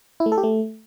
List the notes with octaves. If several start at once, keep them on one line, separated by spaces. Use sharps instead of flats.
E4
A3
A4
G4
A3